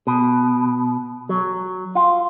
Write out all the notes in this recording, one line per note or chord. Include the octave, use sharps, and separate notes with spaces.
B2
F#3
F4